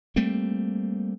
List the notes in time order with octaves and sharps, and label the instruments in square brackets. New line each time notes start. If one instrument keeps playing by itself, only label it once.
[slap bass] G3 A3 A#3 C4